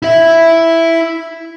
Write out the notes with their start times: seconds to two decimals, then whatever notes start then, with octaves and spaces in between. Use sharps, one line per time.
0.02 E4 E5